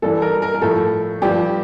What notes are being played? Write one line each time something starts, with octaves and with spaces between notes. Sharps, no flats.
G2 E3 A4
A#4
A#4
A#4
A2 F3 A4
G2 F3 G4